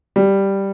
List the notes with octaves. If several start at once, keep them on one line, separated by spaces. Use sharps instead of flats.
G3